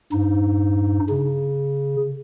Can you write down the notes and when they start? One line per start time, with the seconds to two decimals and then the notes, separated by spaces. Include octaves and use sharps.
0.13 G2 D#4
1.09 C#3